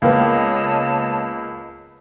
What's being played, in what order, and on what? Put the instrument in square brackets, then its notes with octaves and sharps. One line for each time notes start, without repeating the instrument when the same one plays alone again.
[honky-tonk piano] C#2 A#3 B3 [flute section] C#5 D#5 A5